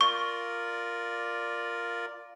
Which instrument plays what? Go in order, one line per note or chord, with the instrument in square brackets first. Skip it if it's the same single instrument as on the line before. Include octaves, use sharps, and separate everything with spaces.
[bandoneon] F4 A#4 D5 [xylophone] C#6